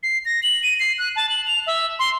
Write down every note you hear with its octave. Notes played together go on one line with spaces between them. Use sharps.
C7
A#6
F#7
D#7
C7
F#6
A5
F#7
F7
E5
C6